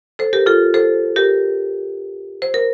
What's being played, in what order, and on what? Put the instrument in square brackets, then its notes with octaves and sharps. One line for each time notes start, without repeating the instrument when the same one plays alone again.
[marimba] A4 C5
G4 A#4
F4 A4
A4 C5
G4 A#4
C5
A#4